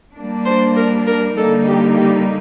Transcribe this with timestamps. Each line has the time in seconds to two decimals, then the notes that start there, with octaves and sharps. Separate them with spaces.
0.16 G3 A#3 D4
0.46 C5
0.77 A#4
1.07 A#4
1.37 D3 G3 A#3 D#4 A4
1.68 G4
1.97 G4